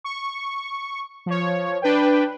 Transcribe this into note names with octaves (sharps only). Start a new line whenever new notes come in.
C#6
F3 C#5
D4 B4 G5